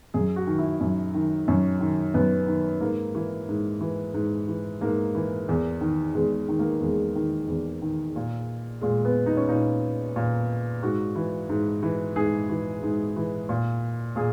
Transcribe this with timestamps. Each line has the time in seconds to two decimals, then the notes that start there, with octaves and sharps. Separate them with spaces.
0.14 F#2 G#4
0.36 F#4
0.47 D#3
0.58 E4
0.81 F#2
1.14 D#3
1.48 F#2 C#4
1.80 D#3
2.14 F#2 B3
2.48 D#3
2.81 G#2 A#3
3.15 E3
3.48 G#2
3.81 E3
4.14 G#2
4.48 E3
4.81 G#2 A#3
5.15 E3
5.49 E2
5.81 D#3
6.15 E2 G#3
6.48 D#3
6.59 A#3
6.81 E2 G#3
7.16 D#3
7.48 E2
7.82 D#3
8.16 A#2
8.81 A#2 G#3
9.05 B3
9.26 D#4
9.37 C#4
9.49 A#2 D#4
10.16 A#2
10.82 G#2 F#4
11.15 E3
11.49 G#2
11.83 E3
12.16 G#2 G#4
12.49 E3
12.83 G#2
13.16 E3
13.49 A#2
14.16 A#2 G#4